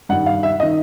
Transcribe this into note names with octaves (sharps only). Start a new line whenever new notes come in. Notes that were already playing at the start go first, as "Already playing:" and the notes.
G2 D#3 F#5
F5
E5
D#5
D#3